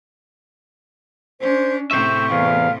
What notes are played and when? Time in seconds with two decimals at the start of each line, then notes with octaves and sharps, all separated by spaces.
1.41 C#4 D4 C5
1.91 A2 C3 C5 E5 C#6
2.31 E2 F5